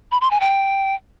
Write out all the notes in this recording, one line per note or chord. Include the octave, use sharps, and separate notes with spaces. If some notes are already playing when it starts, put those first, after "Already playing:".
B5
C6
G#5
G5